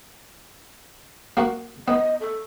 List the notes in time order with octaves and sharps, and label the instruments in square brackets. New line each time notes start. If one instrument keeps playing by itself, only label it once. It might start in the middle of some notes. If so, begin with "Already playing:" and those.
[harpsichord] A#3 F#4 F#5
[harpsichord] B3 [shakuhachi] D#5
[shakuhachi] A4